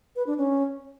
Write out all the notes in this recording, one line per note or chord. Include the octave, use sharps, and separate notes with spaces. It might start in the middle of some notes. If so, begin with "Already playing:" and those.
B4
D4
C#4